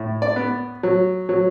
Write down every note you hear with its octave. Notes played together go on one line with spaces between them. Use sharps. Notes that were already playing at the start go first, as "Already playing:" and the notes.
Already playing: A2
D5
B3
F#3
F#3